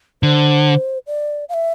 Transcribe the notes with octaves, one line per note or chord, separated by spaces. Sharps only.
D3 C5
D5
F5
E5